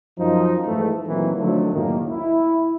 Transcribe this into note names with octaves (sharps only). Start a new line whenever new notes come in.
F#2 F3 D#4
G#2 E3 A3
A#2 D#3 E3 F#3 A#3 C4
D3 D#3 F3 F#3 A3
C#2 F#2 A2 D#3 A#3
E4